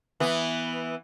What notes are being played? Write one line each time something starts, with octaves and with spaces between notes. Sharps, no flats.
E3 B3